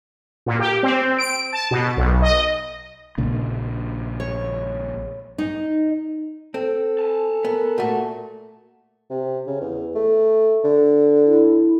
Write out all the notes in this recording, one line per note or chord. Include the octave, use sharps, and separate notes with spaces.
A#2
G4
C4
D7
A5
B2
B1
D#5
A#1 A#2 C#3
C#5
D#4
C4 A4
G#5 A5
B3 A#4
A#2 A3 F#4
C3
C#3
E2
A3
D3
E4